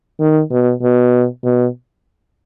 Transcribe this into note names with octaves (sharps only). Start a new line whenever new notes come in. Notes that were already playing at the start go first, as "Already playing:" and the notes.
D#3
B2
B2
B2